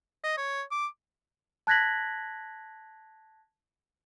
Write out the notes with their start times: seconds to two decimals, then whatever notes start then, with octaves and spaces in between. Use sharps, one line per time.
0.24 D#5
0.37 C#5
0.71 D6
1.67 A5 F#6 G#6 A#6 B6 F#7